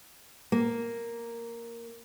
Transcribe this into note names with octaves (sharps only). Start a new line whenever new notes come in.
A#3